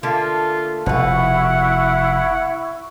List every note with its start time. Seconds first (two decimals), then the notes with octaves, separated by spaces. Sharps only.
0.03 D3 A3 A#3 F4
0.86 F1 B2 E4 B4 F#5 C#6